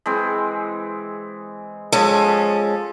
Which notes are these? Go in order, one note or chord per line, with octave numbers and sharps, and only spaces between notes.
E3 G#3 C4
F3 G#3 C#4 A4